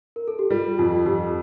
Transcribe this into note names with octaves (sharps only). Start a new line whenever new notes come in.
A#4
A4
G4
G3 F4
F2 F4
F2 G4